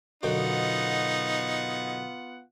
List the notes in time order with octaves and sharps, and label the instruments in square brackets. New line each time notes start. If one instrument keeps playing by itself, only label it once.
[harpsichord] F#2 B2 D3 [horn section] B3 F4 F#5 [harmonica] D#4